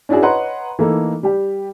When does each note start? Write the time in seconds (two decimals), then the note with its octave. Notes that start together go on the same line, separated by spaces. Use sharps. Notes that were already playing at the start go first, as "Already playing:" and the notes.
0.09 C#4 D4 E4 F#4 G#4
0.22 B4 C#5 D#5 F#5 A#5 C6
0.79 E3 A3 A#3 D#4 A4
1.23 G3 G4